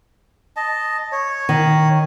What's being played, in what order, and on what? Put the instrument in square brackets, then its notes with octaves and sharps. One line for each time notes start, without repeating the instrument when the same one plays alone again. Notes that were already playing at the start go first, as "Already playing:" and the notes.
[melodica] D#5 A5
C#5
[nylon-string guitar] D#3